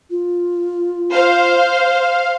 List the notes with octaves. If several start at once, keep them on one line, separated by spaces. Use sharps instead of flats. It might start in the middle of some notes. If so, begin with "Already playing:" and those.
F4
C5 F5